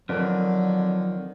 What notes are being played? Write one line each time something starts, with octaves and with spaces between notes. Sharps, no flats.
F2 D3 D#3 F#3 C4